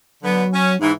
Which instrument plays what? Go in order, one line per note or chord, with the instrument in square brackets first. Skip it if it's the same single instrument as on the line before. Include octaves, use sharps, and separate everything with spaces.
[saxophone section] D3 B3 [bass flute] F#3
[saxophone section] C#4
[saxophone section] G#2 E3 [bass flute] D#4